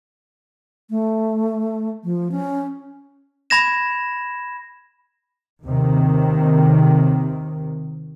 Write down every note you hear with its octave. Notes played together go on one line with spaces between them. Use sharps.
A3
F3
C#4
B5 G#6 A#6 E7
D#2 C3 D#3